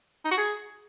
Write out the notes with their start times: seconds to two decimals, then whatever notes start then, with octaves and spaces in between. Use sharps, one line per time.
0.25 D#4
0.31 F#4
0.38 G#4